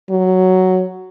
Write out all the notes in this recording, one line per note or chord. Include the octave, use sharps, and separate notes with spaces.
F#3